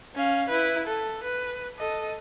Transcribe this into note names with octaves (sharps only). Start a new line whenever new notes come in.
C#4 F5
E4 B4
A4
B4
A4 D#5